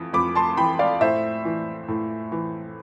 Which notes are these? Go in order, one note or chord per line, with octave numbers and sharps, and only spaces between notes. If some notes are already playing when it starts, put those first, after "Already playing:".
Already playing: F2 E3
F2 B5 D6
A5 C6
E3 G5 B5
D5 F5
A2 C5 E5
E3
A2
E3